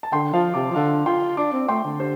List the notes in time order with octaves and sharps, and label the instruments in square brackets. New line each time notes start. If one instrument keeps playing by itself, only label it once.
[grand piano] A5
[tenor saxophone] D3 [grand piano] G5 C6
[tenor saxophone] F3 [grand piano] F5 A5
[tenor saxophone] C3 [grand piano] A5 D6
[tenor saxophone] F3
[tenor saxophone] D3 [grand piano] F5 A5
[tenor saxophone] F4 [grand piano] G5 C6
[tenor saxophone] D4 [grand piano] A5 D6
[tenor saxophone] C4
[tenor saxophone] A3 [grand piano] G5 C6
[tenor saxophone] D3
[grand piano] G4 C5